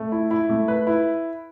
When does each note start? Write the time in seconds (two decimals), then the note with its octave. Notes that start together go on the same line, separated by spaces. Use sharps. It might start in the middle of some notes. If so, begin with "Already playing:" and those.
Already playing: A3
0.12 E4
0.31 E4
0.49 A3
0.68 B4
0.87 E4